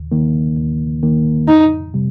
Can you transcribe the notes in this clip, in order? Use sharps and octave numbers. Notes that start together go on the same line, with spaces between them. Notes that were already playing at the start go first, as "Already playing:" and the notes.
Already playing: D#2
D#3 A#3
D#2
D#3 A#3
F2 D#4
C3 G3